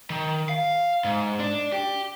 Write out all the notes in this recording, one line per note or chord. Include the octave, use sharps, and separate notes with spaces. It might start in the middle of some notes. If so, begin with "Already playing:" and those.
D#3
F5
G#2
D4
G4